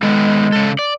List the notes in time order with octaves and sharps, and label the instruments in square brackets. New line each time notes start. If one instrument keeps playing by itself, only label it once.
[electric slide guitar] D#3 B3 A4 [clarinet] G#3
[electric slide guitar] C#3 A4
D5